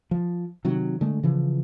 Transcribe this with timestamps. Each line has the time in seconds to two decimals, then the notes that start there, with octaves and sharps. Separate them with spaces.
0.11 F3
0.65 C3 D#3 F#3
1.01 D3 G#3 A3
1.23 C#3 E3 F3